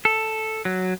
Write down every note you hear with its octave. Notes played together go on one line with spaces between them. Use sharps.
A4
F#3